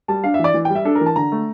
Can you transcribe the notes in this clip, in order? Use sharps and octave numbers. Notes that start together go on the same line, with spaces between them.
G3 A5
D4 F5
E5
E3
D5
E3
G3 G5
E5
D4 A4
A#4
E3
A5
D3 A#5
A3